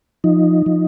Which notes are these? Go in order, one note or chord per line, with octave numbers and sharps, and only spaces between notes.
F3 D#4
F3